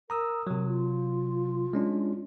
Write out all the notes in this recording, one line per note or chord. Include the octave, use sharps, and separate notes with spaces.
A#4 A#5 D#6 E6
C3 F#3
F4
G#3 C#4 D4